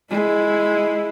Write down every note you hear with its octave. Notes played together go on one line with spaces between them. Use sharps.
G#3 E4